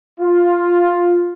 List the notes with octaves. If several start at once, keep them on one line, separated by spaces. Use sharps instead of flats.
F4